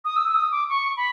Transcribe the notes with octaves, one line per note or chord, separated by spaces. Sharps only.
D#6
E6
E6
D#6
D6
C#6
B5